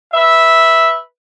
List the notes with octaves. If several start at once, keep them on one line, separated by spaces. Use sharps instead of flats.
B4 E5